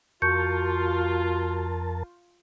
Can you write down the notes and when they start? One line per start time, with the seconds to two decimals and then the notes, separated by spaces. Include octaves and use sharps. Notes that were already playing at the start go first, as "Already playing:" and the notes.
0.22 F2 F4 F#4 A#4 A5 C#6 G6 C#7